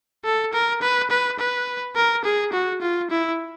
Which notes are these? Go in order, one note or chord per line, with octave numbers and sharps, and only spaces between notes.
A4
A#4
B4
B4
B4
A#4
G#4
F#4
F4
E4